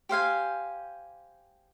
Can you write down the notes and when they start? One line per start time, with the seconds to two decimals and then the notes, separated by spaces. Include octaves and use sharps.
0.09 G4 C5 F5 G#5